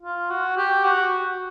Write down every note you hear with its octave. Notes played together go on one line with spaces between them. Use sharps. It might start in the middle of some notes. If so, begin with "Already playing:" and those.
F4
F#4
G4
F#4